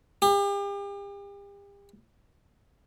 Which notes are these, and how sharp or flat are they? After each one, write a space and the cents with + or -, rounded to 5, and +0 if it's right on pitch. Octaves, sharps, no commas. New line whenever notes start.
G4 +40